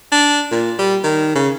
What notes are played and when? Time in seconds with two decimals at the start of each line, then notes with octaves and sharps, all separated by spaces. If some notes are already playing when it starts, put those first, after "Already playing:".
0.12 D4
0.51 A#2
0.79 G3
1.04 D#3
1.35 C#3